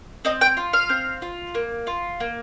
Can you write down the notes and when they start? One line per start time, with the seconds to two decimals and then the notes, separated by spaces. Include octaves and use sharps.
0.25 C4 D#5
0.41 G5
0.57 F4
0.73 F5
0.89 C4
1.22 F4
1.55 A#3
1.87 F4
2.20 A#3